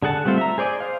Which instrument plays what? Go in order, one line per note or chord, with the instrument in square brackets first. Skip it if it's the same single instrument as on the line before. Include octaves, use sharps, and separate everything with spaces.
[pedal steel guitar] D3 G#4 F#5 A5
G3 A3 C4 F4 C5
E5 A#5
G#4 C5 D5 D#5 G#5
C5 F5